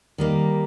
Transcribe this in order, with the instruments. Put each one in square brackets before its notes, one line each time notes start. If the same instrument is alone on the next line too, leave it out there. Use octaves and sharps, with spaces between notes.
[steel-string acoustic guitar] D#3 G3 A#3